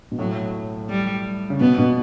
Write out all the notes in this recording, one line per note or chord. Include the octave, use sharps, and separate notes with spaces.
B2
A2 F#3
G3
C#3
B2 B3
B2